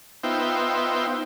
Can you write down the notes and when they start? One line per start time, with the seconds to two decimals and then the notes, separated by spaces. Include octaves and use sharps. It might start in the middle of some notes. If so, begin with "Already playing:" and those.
0.23 B3 D#4 F4 C5 E5 G5